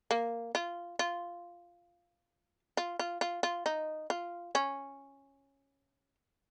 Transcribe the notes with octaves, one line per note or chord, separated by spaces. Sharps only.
A#3
F4
F4
F4
F4
F4
F4
D#4
F4
C#4